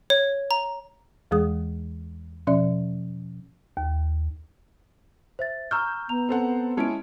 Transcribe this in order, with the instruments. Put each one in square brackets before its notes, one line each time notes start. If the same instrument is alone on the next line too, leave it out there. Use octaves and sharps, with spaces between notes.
[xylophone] C#5
A#5
[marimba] E2 E3 G#3 G#4 D#6
B2 F3 C#4 D5 E5
D#2
[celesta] C5 E5 A6
[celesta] A#5 C#6 F6 [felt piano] E6 G6
[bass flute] B3 [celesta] A#5 F7
[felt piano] C4 A4 F#5
[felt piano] G#3 C#4 E4 [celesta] A5 D7